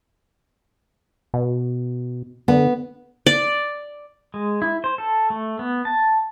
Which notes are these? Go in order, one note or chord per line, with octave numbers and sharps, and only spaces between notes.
B2
D3 B3
D5
G#3
E4
C5
A4
A3
B3
A5